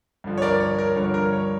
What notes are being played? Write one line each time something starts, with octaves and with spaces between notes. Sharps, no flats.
G2 D3 F3
C#5
A#4 D5
C#5
A#4
G2 D3 F3 C#5
A#4
C#5